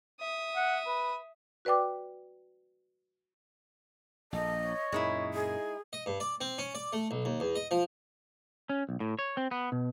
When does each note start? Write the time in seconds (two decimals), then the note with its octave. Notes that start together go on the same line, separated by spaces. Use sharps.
0.20 E5 D#6
0.56 F#5
0.87 B4
1.65 F#4 B4 D5 G5 D6
4.32 A#1 A4 D#5
4.63 C#5
4.92 F#2 A#2 G#3 D#4 E4
5.34 G#4 D#5
5.93 D#5
6.06 G2
6.20 D5
6.41 C4
6.58 C#4
6.75 D5
6.93 A3
7.11 B1
7.25 D#2
7.40 E2
7.56 D#5
7.71 F3
8.69 C#4
8.89 B1
9.00 A2
9.19 C#5
9.37 C4
9.51 B3
9.72 B2